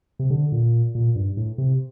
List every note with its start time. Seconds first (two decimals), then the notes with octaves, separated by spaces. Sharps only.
0.19 C3
0.30 D3
0.52 A#2
0.95 A#2
1.16 G2
1.37 A2
1.58 C3